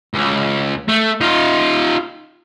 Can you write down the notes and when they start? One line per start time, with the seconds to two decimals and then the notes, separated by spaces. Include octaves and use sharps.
0.14 C#2
0.88 A3
1.21 D#4 F4